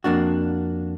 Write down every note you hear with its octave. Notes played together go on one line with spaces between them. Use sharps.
F2 A#3 D4 F#4